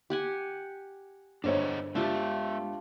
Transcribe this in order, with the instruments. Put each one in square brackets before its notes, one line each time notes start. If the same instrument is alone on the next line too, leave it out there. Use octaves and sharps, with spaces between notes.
[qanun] G4 F#5 G#5
[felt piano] G1 C5 C#5 [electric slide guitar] D4 G#4 D#5
[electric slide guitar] G#3 E5 [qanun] D4 F4 G4